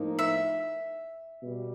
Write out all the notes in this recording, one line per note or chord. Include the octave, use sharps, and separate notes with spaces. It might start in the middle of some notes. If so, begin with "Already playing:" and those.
Already playing: A2 F3 A#3 D#4
E5
B2 G3